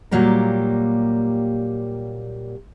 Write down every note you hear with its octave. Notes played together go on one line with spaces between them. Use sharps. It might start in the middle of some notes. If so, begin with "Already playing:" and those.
A#2 F#3 G3 A#3 G4 A#4